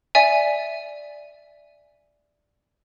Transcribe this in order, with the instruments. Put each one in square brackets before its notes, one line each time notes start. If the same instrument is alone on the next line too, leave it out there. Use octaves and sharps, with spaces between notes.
[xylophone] D5 E5 G#5